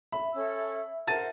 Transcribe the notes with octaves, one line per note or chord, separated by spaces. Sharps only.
E5 B5
C#4 A4 E6
A#4 C5 F#5 A5 A6 D#7